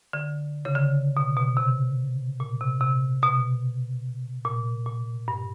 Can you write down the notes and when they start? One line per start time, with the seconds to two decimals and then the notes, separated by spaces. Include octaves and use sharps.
0.13 D3
0.65 C#3
0.76 D3
1.17 B2
1.36 B2
1.57 C3
2.40 A#2
2.61 C3
2.81 C3
3.22 B2
4.45 A#2
4.86 A#2
5.28 G2